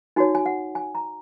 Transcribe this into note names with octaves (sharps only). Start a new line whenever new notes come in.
D#4 F#4 C#5 G#5
G#5
F#5
G#5
A#5